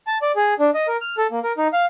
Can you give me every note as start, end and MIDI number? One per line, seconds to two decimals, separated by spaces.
0.07 0.18 81
0.22 0.32 74
0.36 0.54 68
0.59 0.70 62
0.74 0.87 75
0.88 0.97 70
1.01 1.16 89
1.18 1.27 69
1.31 1.39 58
1.43 1.52 70
1.58 1.68 63
1.73 1.85 77